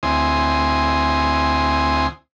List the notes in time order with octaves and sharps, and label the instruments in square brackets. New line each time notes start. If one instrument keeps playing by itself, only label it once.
[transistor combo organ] D2 C4 E4 G#5 C6 D#6